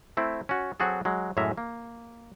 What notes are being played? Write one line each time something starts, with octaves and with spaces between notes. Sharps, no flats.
A3 C4 E4
C#4 F#4
F#3 C4 F#4 G#4 A4
F#3 G#3
F#2 A2 G#3 C#4 E5 A#5
A#3